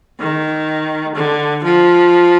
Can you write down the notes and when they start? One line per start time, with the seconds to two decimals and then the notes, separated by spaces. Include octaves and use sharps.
0.20 D#3
1.15 D3
1.64 F3